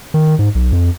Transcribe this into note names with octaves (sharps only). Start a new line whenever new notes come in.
D#3
G#2
B1
F2